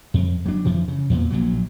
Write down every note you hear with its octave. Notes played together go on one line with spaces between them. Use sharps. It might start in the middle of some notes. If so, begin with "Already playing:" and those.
F2
F#3 D4
F2 E3 F3
C#3
E2 A#2
A#1 A#2 F#3